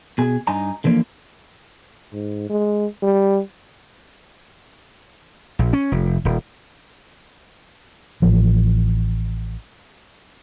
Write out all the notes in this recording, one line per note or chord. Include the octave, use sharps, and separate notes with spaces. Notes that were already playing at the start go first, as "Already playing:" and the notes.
B2 G#4
G2 D#4 G#5 A#5
D3 E3 F3 A#3
G#2
G#3
G3
A#1
C#4
F1
D#1
A1 F3